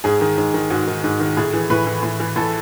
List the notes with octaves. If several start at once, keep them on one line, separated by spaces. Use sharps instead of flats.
G#2 G#4
D#3
G#2
D#3
G#2 F#4
D#3
G#2
D#3
A2 G#4
E3
A2 B4
E3
A2
E3
A2 A4